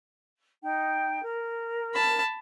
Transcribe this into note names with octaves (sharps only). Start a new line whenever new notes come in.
D#4 G5
A#4
A5 B5